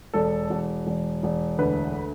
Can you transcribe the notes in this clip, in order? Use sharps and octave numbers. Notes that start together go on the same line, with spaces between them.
E1 A4
E1
E1
E1
D2 B4